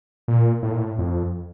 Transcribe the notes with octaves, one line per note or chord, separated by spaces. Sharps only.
A#2
A2
A#2
A2
F2